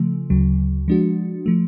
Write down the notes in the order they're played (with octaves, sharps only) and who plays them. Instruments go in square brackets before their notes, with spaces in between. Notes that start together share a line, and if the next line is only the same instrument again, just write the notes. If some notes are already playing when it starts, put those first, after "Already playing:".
Already playing: [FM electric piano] C#3 F3 A3
D2 C#3 F#3
F3 G#3 D4 F#4
F3 A3